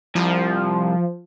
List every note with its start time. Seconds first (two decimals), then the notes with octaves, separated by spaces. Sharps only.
0.15 C2 F3